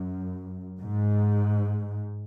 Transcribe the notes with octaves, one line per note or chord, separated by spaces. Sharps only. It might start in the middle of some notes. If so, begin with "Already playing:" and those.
Already playing: F#2
G#2